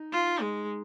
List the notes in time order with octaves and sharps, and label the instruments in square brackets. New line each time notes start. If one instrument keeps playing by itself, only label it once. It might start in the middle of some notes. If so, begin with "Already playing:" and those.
Already playing: [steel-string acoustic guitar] D#4
[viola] F4
G#3